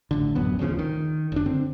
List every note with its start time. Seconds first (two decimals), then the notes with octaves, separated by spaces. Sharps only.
0.11 A1 D3
0.35 D1 A1 F#2 B3
0.59 D#1 D2 C#3 F3
0.79 D#3
1.32 F#1 D4
1.46 D3 C4